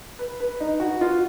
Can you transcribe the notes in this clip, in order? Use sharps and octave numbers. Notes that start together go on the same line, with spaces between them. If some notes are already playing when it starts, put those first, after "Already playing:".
B4
B4
D#4
F#4
F4